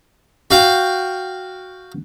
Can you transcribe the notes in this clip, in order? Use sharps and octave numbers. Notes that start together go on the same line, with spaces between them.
F#4 F5 G5